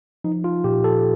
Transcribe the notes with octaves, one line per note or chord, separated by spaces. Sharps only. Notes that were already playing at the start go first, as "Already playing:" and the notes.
F3 D#4
F4
A#2 G4
A4